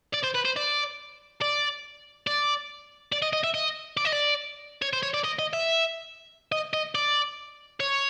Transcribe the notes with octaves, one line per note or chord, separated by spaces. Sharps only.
D5
C5
B4
C5
D5
D5
D5
D5
D#5
D#5
E5
D#5
D5
D#5
D5
C#5
C5
C#5
D5
D#5
D#5
E5
D#5
D#5
D5
C#5